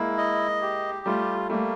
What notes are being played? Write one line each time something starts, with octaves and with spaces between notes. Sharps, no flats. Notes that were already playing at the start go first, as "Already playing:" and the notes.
Already playing: G#3 A#3 E4
D#5
G4
G3 A3 F4
G3 A3 A#3